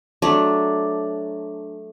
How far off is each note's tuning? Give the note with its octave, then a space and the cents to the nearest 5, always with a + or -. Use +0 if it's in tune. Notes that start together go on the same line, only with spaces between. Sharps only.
F#3 +0 A3 -10 D4 +0